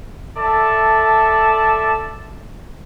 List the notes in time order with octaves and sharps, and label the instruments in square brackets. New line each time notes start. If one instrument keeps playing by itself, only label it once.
[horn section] A4 D5 E5 A5